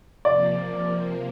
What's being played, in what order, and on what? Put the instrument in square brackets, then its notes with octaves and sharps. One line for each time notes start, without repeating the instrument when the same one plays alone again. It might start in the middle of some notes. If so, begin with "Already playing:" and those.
[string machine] C3 F3 A#3 [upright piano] D5